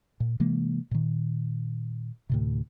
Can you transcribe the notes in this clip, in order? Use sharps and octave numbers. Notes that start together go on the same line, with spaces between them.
A#2
C3 E3 G#3 A#3
A#2 D#3
D2 A2 C3